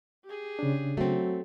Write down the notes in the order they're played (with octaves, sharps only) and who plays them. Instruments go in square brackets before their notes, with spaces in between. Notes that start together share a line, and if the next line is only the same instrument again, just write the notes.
[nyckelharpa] G4 G#4
[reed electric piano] C#3 D4
[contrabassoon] F#3 [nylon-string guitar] A3 C4